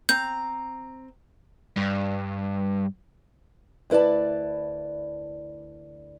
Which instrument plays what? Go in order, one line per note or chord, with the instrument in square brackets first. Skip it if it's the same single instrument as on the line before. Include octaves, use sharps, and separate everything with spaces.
[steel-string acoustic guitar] C4 A#5 [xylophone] G6
[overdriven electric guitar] G2
[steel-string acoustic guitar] D2 E4 B4 D5 A5